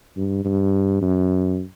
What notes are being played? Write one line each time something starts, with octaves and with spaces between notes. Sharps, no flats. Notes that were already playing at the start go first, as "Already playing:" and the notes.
G2
G2
F#2